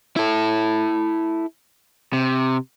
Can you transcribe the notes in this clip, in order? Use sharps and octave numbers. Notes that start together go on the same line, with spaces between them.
E4 A4
C3